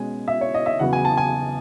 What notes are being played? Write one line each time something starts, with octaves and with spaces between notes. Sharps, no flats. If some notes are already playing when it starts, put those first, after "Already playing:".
Already playing: B2 G#3 C#4 G#5
E5
C#5
D#5
E5
E2 C#3 F#3 B3 F#5
G#5
A5
G#5